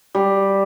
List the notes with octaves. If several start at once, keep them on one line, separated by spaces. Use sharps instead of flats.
G3